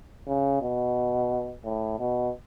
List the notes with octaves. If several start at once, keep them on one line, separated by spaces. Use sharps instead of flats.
C#3
B2
A2
B2